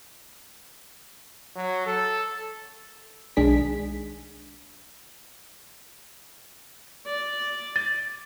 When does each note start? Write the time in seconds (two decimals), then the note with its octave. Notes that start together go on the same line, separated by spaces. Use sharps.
1.56 F#3
1.86 A4
3.37 B1 D#3 G#3 D4 G#4 B6
7.06 D5
7.76 A6